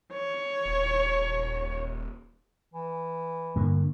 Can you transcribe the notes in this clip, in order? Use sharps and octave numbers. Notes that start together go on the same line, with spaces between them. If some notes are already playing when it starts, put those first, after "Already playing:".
C#5
D#1
E3
G2 D3 A#3